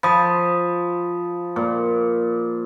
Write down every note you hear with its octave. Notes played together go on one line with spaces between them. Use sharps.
F3 B5 D#6
A#2